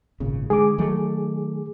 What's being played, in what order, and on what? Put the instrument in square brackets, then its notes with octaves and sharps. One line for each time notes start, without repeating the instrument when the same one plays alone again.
[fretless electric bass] G#1 A#2 C#3
[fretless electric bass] D3 G#3 [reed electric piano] G#4 D6
[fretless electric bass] D#3 F#3 A3